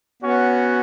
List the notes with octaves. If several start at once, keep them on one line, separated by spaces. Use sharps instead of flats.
B3 C#4 F#4 C#5 F#5